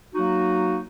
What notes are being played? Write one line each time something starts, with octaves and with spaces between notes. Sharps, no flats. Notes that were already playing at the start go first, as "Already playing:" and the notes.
F#3 A#3 D#4 F#4